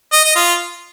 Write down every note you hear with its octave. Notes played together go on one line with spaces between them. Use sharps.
D#5
D#5
F4